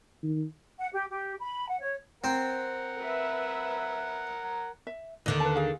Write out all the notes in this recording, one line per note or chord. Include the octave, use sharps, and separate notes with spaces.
D#3
F#5
G4
G4
B5
F#5
C#5
C4 A#4 F#5
B4 E5
E5
D#2 D3 D#3 D#5
B4 A5
G#4 F5